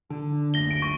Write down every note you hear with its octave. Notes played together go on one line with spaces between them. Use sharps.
D3
F#1 D2 A#6 G7
D7
C#6 A#6